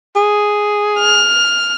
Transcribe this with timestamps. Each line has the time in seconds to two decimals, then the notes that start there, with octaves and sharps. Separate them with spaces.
0.16 G#4
0.99 F6